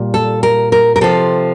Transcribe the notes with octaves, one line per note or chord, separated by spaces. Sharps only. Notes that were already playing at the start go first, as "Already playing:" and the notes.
Already playing: A#2 G3
A4
A#4
A#4
A#4
C3 F3 A4